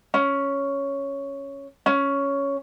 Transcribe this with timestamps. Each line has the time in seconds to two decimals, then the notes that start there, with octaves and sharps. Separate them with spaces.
0.14 C#4
1.86 C#4